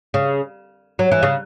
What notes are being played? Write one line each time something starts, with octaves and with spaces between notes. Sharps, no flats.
C#3
F#3
E3
C#3